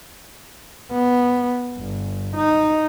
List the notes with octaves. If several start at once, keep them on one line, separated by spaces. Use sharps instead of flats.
B3
G1
D#4